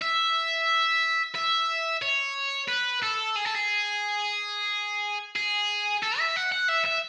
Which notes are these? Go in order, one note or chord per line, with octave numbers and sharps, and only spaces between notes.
E5
E5
C#5
B4
A4
G#4
A4
G#4
G#4
A4
E5
F#5
F#5
E5
E5